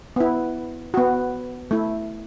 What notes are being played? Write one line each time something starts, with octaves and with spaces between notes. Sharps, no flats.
B3 E4
B3 F#4
A3 E4